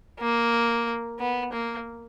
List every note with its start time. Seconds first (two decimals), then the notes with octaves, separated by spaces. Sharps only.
0.20 A#3
1.20 B3
1.53 A#3